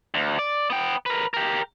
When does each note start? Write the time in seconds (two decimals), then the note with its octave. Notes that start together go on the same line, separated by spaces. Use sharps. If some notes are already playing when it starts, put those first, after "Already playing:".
0.14 D2
0.39 D5
0.70 B3 G5
1.06 A#4 B4
1.34 G4 A#4